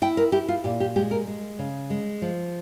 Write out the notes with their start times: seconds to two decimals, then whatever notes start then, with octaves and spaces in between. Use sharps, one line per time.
0.02 E4 G5
0.17 A#4
0.32 E4 G4
0.48 F4
0.64 A#2 G4
0.80 G4
0.96 G#3 G4
1.11 A#4
1.27 G#3
1.59 C#3
1.90 G#3
2.22 F3